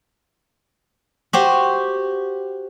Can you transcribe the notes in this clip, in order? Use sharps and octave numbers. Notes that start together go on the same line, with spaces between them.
F#4 G4 C5